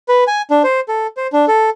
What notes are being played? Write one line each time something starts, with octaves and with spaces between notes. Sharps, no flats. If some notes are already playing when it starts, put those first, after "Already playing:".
B4
G#5
D4
C5
A4
C5
D4
A4